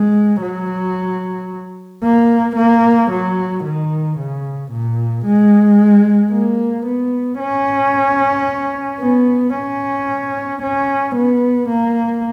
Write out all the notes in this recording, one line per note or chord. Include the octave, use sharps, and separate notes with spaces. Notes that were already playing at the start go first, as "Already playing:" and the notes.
Already playing: G#3
F#3
A#3
A#3
F#3
D#3
C#3
A#2
G#3
A#3
B3
C#4
B3
C#4
C#4
B3
A#3